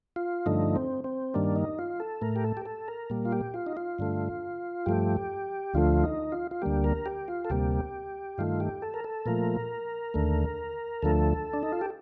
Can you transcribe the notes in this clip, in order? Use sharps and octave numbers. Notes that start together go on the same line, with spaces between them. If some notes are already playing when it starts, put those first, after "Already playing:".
F4
G2 D3 F3 A3 D#4
C4
C4
G2 D#3 G3 A#3 D4
D#4
F4
A4
A2 A3 A#4
G4
A4
G4
A4
A#4
A#2 G3 A#3
F4
G4
F4
D#4
F4
G2 D3 A3
G2 F3 A3 G4
D2 D3 F3 A3 F4
D#4
F4
F4
D2 D3 G3 A#3 G4
A#4
G4
F4
A4
D2 C3 G3 A#3 G4
G2 D#3 A3 F4
G4
A4
A#4
A4
A#2 F3 A3 A#4
D#2 D3 A3
D2 D3 F3 A3 A4
D4
D#4
F4
G4